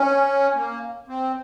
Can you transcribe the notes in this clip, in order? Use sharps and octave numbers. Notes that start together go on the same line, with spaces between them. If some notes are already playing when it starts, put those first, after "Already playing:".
Already playing: C#4
A#3
C4